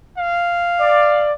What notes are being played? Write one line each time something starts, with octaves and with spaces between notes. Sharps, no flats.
F5
D5